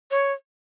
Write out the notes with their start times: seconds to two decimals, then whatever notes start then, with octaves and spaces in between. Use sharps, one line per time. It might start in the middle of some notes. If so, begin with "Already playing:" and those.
0.11 C#5